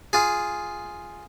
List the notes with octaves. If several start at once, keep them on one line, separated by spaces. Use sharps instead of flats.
F4 G#4